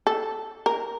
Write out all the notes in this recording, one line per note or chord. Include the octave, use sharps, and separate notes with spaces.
A4
A#4